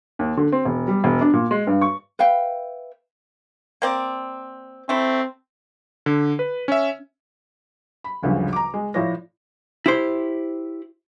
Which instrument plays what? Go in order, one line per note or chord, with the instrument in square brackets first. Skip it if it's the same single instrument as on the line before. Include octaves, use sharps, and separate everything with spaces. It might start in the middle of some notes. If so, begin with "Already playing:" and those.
[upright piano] D#2
D3
C4
E1
G3
E1
D4
A#2
G#3
G2
C#6
[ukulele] B4 E5 F5 G5
[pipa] A#3 C4 D5
[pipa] A3 E4 [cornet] C4
[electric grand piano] D3
B4
C#4 E5
[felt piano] B5
F#1 D2 G2 C#3 F3
A#5 D6
G#3
A2 F3 E4 C#5 D5 A#6
[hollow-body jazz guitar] E4 G4 C5